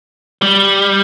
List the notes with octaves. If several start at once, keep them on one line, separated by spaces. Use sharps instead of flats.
G3